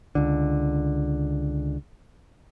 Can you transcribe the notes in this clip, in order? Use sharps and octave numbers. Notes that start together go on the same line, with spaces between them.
C#2 D3